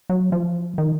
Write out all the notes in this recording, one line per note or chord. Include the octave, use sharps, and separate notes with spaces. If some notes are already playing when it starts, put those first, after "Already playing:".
F#3
F3
D#3